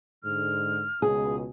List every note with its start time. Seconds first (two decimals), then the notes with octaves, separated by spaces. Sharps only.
0.24 G#2 D3 F6
1.02 C#2 B2 G#4